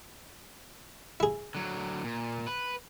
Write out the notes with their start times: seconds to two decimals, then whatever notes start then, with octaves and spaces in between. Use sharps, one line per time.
1.20 E4 G#4
1.55 D3 F#3
2.04 A#2
2.47 B4